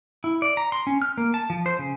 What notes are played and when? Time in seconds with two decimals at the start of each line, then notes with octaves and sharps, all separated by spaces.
0.24 E4
0.42 D5
0.57 A#5
0.72 C6
0.87 C#4
1.02 F6
1.18 A#3
1.34 A5
1.50 F3
1.66 C5
1.79 C#3